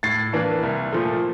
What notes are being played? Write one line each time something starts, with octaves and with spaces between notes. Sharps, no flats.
A2 A6 C7
E3 A#3 D4
C2
A#2 F3 A3